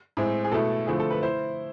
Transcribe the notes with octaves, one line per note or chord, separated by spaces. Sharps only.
A2 G#3 C4
G#4
B2 A3 E4 A4
D3 F3 A3 C4 E4 G#4
A4
B4
E4 C5